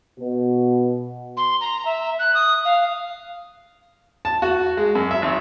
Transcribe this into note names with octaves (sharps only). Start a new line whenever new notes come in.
B2
C6
A#5
E5
F#6
D#6
F5
A5
F#4
G#3
F#2
E5
G#1